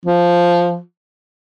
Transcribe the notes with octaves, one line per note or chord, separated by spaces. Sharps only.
F3